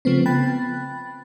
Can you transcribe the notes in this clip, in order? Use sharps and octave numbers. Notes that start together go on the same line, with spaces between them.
C#3 F3 A3 B3 C4
G5 B5 F#6 A6